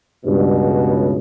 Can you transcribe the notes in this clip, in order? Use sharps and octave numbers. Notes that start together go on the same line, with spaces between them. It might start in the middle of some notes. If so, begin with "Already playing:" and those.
C#2 G2 B2